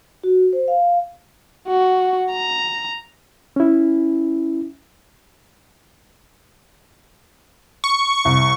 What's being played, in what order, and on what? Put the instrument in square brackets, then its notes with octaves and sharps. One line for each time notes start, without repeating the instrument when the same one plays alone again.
[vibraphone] F#4
C5
F5
[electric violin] F#4
A#5
[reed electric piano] C#4 E4
[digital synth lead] C#6
[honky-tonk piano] C2